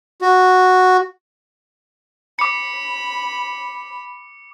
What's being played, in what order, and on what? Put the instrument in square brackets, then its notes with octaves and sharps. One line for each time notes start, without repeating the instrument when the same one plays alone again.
[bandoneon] F#4
[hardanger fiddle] B5 [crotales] D6 C#7